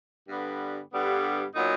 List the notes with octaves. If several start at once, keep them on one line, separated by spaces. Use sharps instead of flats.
G2 D3 G3 B3
G2 D3 G3 B3
A#2 F#3 B3 D#4